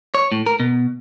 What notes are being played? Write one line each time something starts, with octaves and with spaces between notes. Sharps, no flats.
C#5
A2
A#4
B2